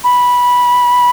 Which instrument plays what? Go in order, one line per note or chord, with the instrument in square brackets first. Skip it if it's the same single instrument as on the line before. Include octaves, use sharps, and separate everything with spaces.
[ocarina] B5